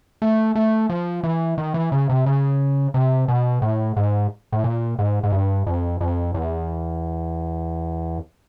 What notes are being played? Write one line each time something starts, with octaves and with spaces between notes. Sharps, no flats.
A3
A3
F3
E3
D#3
E3
C#3
C3
C#3
C3
B2
A2
G#2
A2
A#2
G#2
G#2
G2
F2
F2
E2